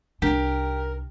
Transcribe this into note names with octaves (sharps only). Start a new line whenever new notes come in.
C2 D4 D#4 G4 A#4